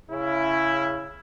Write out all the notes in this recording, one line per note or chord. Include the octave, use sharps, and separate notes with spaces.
C#3 E4